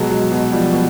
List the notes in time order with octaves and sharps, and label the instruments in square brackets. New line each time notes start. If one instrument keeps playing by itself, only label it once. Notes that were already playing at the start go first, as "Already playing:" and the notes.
Already playing: [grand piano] B2 F#3 G#3
F#3 G#3
B2
F3 G3
B2